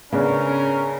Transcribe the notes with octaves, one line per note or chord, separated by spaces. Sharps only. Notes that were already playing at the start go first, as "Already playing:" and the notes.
C#3 B3 C#4 D4 A#4